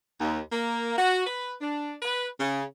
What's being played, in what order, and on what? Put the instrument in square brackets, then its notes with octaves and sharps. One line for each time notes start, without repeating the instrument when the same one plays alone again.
[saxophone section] D#2
A#3
F#4
B4
D4
B4
C#3